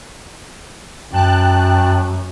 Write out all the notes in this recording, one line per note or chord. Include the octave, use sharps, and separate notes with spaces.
F#2 G5 A5 F#6